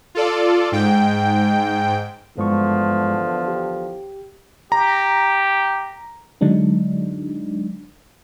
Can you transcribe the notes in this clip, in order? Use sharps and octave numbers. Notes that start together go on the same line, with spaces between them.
F4 A4 D5
G#2 G5
E2 G2 D3 F3 G#3 C#6
G4
G4 A#5
D3 F#3 G#3 D4 D#4